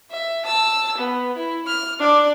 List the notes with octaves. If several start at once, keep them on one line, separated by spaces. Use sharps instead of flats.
E5
A5 E6
B3
E4
F6
D4 D5